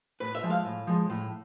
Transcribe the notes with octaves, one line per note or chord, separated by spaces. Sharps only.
A2 B4
E5
F3 G#3
F5
A2
F3 G#3
A2